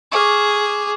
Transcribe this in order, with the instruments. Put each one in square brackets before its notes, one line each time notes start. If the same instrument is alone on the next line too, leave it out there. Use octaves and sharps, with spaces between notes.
[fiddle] G#4 [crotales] C#6 D6 F6